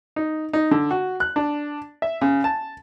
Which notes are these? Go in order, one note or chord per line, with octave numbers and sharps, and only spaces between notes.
D#4
D#4
D3
F#4
F#6
D4
E5
C#3
A5